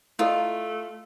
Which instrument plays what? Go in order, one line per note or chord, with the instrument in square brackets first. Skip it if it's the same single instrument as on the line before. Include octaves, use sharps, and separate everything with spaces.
[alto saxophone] A3 [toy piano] E4 A4 D#5 [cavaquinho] F4